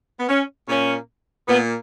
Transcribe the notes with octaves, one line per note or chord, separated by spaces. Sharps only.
B3
C#4
A#2 A#3 C#4
A#2 A#3 B3